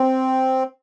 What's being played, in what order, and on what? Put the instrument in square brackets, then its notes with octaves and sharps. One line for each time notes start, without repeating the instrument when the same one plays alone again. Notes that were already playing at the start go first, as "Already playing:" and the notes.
Already playing: [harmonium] C4